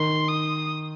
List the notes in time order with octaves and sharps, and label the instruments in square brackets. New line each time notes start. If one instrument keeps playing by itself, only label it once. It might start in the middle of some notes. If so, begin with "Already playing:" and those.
Already playing: [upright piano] D#3 [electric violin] C6
[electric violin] D#6